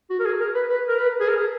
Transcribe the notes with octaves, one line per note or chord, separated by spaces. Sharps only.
F#4
A#4
G#4
A#4
B4
B4
A#4
B4
G#4
A#4